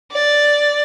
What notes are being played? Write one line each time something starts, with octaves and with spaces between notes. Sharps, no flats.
D5